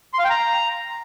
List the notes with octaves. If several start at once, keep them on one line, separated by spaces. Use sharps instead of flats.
C6
F5
G5
A#5